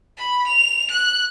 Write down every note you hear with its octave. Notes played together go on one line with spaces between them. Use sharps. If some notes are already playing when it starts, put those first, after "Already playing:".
B5
F7
F#6